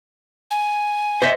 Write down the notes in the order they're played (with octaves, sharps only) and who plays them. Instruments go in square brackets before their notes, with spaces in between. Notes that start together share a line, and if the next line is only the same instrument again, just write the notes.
[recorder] G#5
[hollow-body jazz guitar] C5 D#5 E5